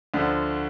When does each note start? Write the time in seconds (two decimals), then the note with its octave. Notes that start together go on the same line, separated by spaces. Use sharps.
0.14 D2 D3 F3